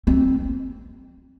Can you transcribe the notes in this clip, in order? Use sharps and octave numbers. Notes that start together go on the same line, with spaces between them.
C4